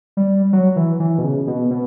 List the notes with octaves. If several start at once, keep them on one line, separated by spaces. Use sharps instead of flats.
G3
F#3
E3
E3
B2
C#3
B2
B2